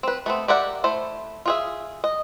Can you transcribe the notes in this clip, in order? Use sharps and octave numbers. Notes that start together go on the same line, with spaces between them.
C4 B4
A3 B3 C4
G4 A#4 D5 E5 F#5
A3 E4 C5
F4 G#4 E5
D#5